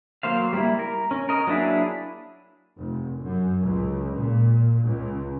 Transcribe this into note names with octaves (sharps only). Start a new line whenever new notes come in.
F#3 A#3 C5 F5
G3 A#3 E4
A#4
C#4
A#4 D#5
F#3 A#3 D4 E4 G#4
F1
F#2
C#2
A#2
C#2